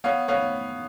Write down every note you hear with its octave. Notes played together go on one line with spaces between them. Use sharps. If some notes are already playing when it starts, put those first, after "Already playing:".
B3 C#5 F5
B3 C#5 F5